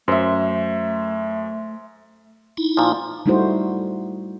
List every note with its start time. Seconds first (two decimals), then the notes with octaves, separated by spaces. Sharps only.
0.08 F#2 A3 C5 E5
2.57 D#4 E4
2.77 A#2 F3
3.26 G3 A3 D#4 E4 F#4 C5